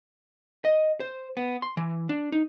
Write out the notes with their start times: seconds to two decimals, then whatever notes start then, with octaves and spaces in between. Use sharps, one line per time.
0.65 D#5
1.00 C5
1.37 B3
1.62 C6
1.77 E3
2.09 D4
2.32 D#4